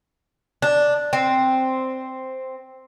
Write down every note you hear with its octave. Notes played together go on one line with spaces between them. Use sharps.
D4
C4